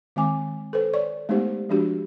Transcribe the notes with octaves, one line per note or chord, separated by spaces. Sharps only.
D#3 G#3 C4 G#5 D6
A4 B4 C5
C#5 D5 C#6
G#3 A3 B3 D#4 G4 C5
F3 G#3 D4 F#4 G4